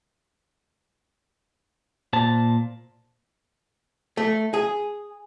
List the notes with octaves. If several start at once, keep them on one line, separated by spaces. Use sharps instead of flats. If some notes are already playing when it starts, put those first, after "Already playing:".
A#2 C5 A5
A3
G#4